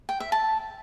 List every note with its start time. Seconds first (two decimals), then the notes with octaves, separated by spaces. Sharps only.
0.09 G5
0.20 E5
0.32 A5